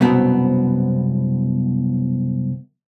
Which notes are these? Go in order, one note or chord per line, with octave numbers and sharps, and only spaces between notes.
C2 F#2 B2 B3 C4